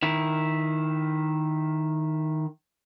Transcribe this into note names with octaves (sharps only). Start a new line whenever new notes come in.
D#3 E4